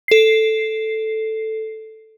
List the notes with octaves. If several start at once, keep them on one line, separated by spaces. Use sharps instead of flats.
A4 C7